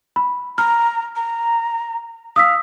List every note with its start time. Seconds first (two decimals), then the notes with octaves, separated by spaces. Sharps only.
0.16 B5
0.58 A#5 F6
1.16 A#5
2.36 F5 D#6 E6 B6